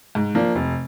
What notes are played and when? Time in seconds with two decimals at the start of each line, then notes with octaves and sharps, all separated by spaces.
0.15 G#2
0.35 F3 A#3 D4
0.55 F1